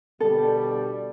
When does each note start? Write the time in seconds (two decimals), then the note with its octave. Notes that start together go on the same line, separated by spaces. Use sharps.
0.20 B2 D3 G3 A4